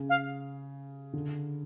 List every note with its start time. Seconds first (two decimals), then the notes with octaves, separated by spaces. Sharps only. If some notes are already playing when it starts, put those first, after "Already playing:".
Already playing: C#3
0.09 F5
1.13 D3